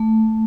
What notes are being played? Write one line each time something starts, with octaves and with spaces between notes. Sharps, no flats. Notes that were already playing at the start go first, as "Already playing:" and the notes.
Already playing: A3